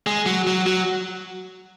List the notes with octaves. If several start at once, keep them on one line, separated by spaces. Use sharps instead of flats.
G#3
F#3
F#3
F#3